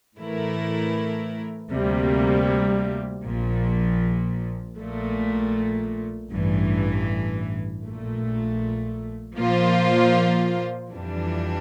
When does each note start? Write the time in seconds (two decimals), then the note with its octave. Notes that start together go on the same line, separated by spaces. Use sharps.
0.17 A2 E3 A3 E4 A#4
1.71 D2 C3 G3 A#3
3.24 A#1 A#2 F3
4.78 A#1 A#2 A3
6.30 A1 G2 E3
7.84 A#1 A#2 A3
9.37 A#2 F3 A#3 F4 C5
10.91 F2 E3 G3 D4